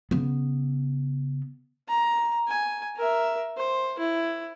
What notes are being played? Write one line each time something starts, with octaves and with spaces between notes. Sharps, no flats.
C#3 B3
A#5
G#5
A#4 E5
C5
E4